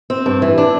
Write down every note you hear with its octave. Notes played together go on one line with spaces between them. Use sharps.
C4
G2
E3
D4